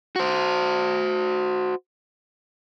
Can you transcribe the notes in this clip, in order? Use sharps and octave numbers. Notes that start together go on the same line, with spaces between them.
F#4 C5